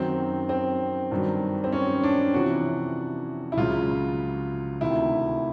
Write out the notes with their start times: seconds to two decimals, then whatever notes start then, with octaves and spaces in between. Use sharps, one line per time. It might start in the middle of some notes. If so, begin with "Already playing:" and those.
Already playing: F#2 D#3 F#3 C4
0.49 C4
1.11 G2 D#3 F#3
1.64 C4
1.72 C#4
2.03 D4
2.34 F2 C3 E3 F#4
3.52 E4
3.57 C#2 C#3 F#3 F4
4.81 D2 C3 D#3 E4